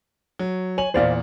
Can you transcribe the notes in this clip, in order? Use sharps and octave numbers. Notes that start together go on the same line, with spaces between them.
F#3
C#5 G#5 F#7
E2 A#2 C5 D5 F5